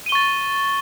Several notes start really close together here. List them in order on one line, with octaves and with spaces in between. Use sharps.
D#7 G7 C#6 A6